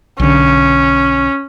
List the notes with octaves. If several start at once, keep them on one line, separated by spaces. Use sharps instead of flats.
B1 D3 C#4